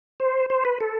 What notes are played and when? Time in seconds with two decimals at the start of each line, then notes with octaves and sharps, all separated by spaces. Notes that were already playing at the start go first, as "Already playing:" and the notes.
0.20 C5
0.50 C5
0.65 B4
0.80 A4